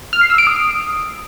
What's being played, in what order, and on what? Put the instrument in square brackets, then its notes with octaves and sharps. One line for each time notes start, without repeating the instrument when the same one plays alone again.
[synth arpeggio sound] F6
C7
E6
D7
D#6